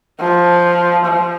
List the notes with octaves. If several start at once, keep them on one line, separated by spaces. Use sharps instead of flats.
F3
F3